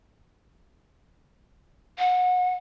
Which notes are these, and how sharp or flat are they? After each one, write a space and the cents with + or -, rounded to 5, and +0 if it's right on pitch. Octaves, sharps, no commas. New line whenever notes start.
F#5 -30